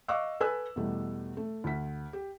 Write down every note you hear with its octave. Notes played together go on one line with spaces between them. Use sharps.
D#5 F5 C#6 D6 E6 F#6
A4 B4 G#5 E6 F#6
E2 B2 G3 A3
A3
D2 B6
G4